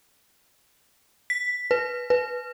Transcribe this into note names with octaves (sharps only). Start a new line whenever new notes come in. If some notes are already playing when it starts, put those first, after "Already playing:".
B6
B4
B4